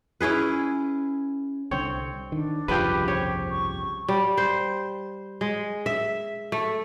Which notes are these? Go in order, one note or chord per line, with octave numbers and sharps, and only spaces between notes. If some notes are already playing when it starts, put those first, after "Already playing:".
C#4 E4 G#4 B4
C2 D3 C4 C#5
D#3 D4
G1 C2 F2 C#3 F3 G3 G4 B4
G4 C5 C#5
C#6
G3
C5
G#3
E5
A3